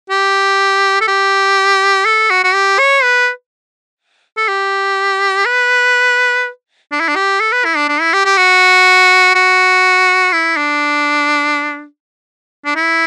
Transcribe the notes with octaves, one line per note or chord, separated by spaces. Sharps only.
G4
A4
G4
A4
F#4
F#4
G4
C#5
B4
A4
G4
B4
D4
E4
D4
G4
A4
B4
E4
D4
D4
E4
G4
G4
F#4
F#4
E4
D4
D4
E4